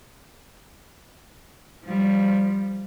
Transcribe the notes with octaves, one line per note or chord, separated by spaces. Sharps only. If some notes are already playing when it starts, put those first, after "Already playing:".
F3 G3